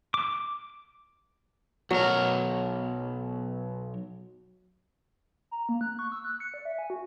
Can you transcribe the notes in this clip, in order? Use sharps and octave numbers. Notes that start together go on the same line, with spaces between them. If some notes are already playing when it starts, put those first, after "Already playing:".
D6
B1 F#3 A#4
A#5
A#3
F#6
C#6
E6
F#6
C#7
D5
E5
G#5
F#4